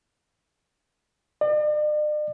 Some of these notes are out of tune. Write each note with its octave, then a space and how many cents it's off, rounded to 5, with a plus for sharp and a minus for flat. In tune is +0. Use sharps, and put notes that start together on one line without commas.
D5 +45